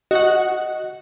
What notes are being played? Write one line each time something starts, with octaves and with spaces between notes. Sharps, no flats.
F#4 D#5 F#5